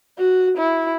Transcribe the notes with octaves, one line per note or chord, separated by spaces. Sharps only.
F#4
E4